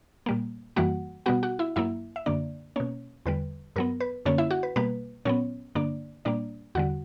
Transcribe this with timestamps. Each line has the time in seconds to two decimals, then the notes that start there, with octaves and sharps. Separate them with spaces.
0.26 A#2 G3 A#3
0.76 F#2 E3 G3 A#3 F#4 F#5
1.26 B2 G3 B3 F#4 F#5
1.43 F#4 F#5
1.59 E4 E5
1.76 G2 F#3 A#3 E4 E5
2.16 E5
2.26 F#2 D3 A#3 D4 D5
2.76 B2 A#3 C#4 C#5
3.26 E2 D3 G3 B4
3.76 G2 F#3 B3 A#4
4.00 B4
4.25 F#2 D3 A#3 C#4 C#5
4.38 E4 E5
4.51 F#4 F#5
4.63 B4
4.76 B2 G3 A#3 B4
5.25 A#2 F#3 B3 C#4 C#5
5.75 G2 D3 A#3 D4 D5
6.25 A#2 G3 A#3 D4 D5
6.75 E2 D3 G3 F#4 F#5